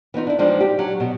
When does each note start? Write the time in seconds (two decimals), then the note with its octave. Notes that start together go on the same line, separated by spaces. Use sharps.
0.14 E3 B3 D#4 F4
0.27 D4 E4
0.39 F3 G3 G#3 D4 D#4 F4
0.60 G4
0.79 F#3
1.00 B2